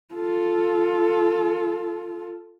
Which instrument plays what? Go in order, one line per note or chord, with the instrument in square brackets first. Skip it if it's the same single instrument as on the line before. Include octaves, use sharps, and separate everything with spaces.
[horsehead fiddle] F4 A4